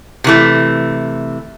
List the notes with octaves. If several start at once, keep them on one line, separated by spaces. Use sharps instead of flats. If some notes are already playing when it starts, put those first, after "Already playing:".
C3 E3 A3